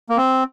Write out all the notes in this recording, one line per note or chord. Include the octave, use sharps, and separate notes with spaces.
A#3
C4